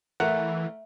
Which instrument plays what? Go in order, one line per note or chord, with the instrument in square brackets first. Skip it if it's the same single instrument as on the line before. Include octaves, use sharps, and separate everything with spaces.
[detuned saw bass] E3 [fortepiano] A3 A#4 [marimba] E5 [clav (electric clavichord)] F#5